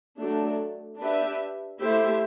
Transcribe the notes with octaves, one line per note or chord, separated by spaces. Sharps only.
F#3 A3 D4
D4 G4 B4 E5
A3 E4 G4 C5 E5